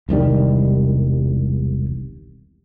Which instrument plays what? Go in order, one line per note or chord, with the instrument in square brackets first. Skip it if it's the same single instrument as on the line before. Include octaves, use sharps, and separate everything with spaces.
[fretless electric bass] E1 C2 D#3 G3